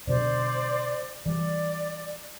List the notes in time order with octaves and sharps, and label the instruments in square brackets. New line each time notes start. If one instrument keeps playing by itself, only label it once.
[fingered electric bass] B2 D3 F#3 [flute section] C5 D5
[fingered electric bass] E3 G3 [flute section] D5